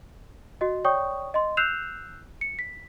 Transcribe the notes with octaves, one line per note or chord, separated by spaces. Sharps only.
F#4 D#5
C#5 D5 G5 C#6 D#6
D#5 C6
E6 F#6 G6 C7 E7 F7
C#7
B6